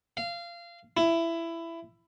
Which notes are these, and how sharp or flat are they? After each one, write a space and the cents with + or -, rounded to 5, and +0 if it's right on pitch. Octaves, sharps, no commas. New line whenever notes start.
F5 -20
E4 +15